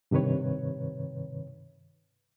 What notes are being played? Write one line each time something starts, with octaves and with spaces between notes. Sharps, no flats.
G2 C3 D#3 B4 C#5